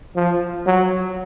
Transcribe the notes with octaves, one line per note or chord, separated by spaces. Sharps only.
F3
F#3